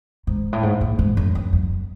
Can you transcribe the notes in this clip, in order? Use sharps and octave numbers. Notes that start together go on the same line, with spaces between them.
G#2
A2
G#2
A2
G#2
F#2
F#2
F#2